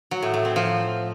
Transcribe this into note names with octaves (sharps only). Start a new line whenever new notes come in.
F#3
A2
A2
C4
F3